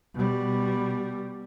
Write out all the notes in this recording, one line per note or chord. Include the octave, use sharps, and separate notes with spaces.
B2 G3